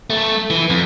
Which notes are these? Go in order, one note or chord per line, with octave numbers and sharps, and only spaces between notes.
A3
E3
F2